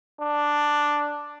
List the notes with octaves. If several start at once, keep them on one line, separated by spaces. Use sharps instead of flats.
D4